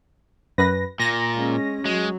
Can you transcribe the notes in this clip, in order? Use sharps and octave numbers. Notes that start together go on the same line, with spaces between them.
F#2 B4 A#6
A#2 A#6
G#3 C#4
F#3 G#3